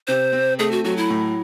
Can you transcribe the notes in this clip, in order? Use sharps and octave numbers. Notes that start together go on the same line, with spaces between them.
C3 C5
C4
A3 G#4
F#4
F#3 F#4
E4
A2